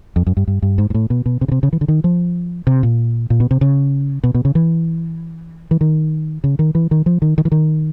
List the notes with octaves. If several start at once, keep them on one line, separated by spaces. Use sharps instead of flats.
F2
F#2
G2
G2
G2
G#2
G#2
A2
B2
B2
C3
C#3
C3
C#3
E3
D3
D#3
F3
C3
A#2
A#2
B2
C3
C#3
B2
B2
C#3
E3
E3
D#3
C#3
D#3
E3
D#3
F3
D#3
D#3
E3
D#3